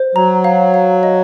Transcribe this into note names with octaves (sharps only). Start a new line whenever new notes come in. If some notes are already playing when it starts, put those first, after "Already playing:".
Already playing: C5
F#3 A#5
F5
F5
D#5